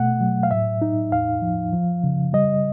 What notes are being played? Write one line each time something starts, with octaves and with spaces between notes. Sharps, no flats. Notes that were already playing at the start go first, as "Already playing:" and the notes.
Already playing: B2 A3 F#5
F#3
F5
A2 E5
D#4
E2 F5
F3
F3
C#3
G3 D#5